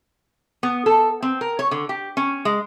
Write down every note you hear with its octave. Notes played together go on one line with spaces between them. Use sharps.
B3
A4
C4
A#4
C#5
D3
G4
C#4
G#3